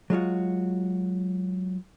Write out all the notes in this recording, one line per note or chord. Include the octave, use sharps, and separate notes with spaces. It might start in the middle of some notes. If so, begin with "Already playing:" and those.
F#3 G#3 F4 F#4